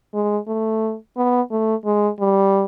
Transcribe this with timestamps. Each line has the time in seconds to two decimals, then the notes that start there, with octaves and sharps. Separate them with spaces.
0.14 G#3
0.48 A3
1.17 B3
1.51 A3
1.85 G#3
2.20 G3